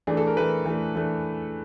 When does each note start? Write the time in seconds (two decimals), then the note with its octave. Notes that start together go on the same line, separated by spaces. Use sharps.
0.07 E3 A3 D4 G#4
0.17 A4
0.27 A#4
0.37 E3 A3 D4 B4
0.66 E3 A3 D4
0.95 E3 A3 D4